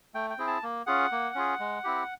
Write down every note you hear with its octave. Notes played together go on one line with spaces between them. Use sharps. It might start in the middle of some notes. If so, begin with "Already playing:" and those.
A3 G5
G5
C4 E4 G#4
A5
A#3
C#4 F4 G#4 F#5
A#3
C#4 F4 G#4
G#3
C4 E4 G4